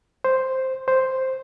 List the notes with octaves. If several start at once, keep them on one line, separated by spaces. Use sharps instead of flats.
C5
C5